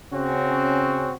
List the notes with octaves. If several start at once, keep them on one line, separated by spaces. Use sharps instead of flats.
C#3 C4 C#4 F#4